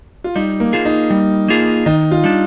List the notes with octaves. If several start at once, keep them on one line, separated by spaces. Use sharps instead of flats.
F4
G3 D#4
A#3
A#3 F4 G#4
D#4
G3
A#3 F4 G#4
D#3 D#4
F4
G3 D4